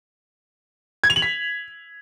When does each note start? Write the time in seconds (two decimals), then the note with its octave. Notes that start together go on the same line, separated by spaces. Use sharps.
1.04 G#6
1.10 F7
1.16 F#7
1.22 B6